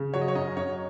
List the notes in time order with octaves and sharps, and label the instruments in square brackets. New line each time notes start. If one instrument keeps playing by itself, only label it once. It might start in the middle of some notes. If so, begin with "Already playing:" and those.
Already playing: [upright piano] C#3
[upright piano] F#3 [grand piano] C#5
[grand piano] D#5
C#5
[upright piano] F#2 [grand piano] D#5
[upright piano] F#2 [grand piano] C#5